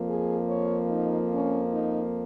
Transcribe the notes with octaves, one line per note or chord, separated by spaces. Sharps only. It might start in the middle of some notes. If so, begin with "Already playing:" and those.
Already playing: F2 F3 A#3
G#4
C#5
D#4
C#4
D#4